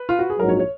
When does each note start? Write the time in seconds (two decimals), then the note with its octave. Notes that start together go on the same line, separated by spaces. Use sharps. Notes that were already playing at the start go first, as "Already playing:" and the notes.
Already playing: B4
0.09 F4
0.19 F#4
0.30 G#4
0.39 A#1 G#2 F#3 A#4
0.49 C#5
0.59 C#5